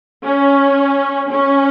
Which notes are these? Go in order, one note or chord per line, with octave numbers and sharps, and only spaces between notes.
C#4
C#4